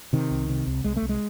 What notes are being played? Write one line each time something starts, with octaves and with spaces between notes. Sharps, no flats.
C3 D#3
C2
C3
C2
C2 G#3
A3
C2
G#3